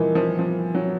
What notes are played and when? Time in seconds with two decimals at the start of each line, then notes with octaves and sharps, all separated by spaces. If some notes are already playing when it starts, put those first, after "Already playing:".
Already playing: A#2 E3 F3 G3 C4 D#4
0.15 F3
0.39 F3
0.75 F#3